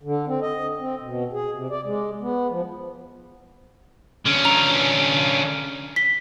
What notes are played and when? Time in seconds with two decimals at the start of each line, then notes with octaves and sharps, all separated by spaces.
0.03 D3
0.27 C4
0.42 D#5
0.79 C4
1.02 B2
1.33 G#4
1.52 C3
1.70 D5
1.85 G#3
2.21 B3
2.50 F3
4.25 D3 C#4
4.45 A#5 G7
5.96 B6 G7